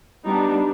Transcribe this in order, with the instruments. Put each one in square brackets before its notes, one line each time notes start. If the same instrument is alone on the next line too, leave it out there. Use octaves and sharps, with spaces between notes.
[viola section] G3 B3 D4 D#4